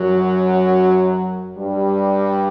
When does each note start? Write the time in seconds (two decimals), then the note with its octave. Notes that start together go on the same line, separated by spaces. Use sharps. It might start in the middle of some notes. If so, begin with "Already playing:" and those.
Already playing: F#2 F#3
1.57 G2 G3